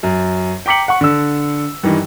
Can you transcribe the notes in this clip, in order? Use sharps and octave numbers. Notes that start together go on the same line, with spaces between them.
F#2
G5 A#5 D6 B6 C#7 F#7
F#5 C#6
D3 E6
G2 D#3 E3